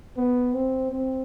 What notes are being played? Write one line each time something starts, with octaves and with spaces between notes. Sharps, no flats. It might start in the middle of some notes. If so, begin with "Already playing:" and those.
B3
C4
C4